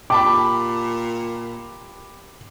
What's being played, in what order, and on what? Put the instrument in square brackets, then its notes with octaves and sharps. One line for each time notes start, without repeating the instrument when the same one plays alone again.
[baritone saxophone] A#2 [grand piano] G4 A5 B5 [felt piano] D6